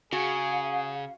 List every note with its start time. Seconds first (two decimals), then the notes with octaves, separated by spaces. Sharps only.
0.13 C#3 F#4 G#4 F5